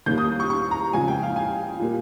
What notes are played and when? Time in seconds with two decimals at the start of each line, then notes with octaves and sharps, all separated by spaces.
0.06 D#2 D#3 G3 A#3 G6
0.18 D#6
0.40 C#6
0.50 C#6
0.71 A#5
0.93 F2 C#3 G#3 G#5
1.08 G5
1.23 F5
1.36 G#5
1.80 A#2 G3 A#3